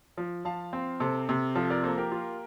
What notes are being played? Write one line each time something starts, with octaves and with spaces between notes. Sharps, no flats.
F3
F3 F5 A5
C4
C3 A4 C5
C3
F3 F4 A4
A#4 D5
A#3 A4 C5
G4 A#4
F4